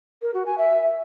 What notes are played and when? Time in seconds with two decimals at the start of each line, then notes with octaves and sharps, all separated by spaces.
0.22 A#4
0.34 F#4
0.46 G#5
0.58 E5